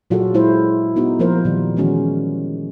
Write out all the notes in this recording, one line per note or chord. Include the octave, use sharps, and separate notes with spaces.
A#2 F#3 F4 F#4 G#4 A4
G#3 E4 F4 C5
B3 D#4 F#4
F3 A#3 F4 A#4 C5
A#2 D#3 G3
D#3 E3 G#3 C#4 F#4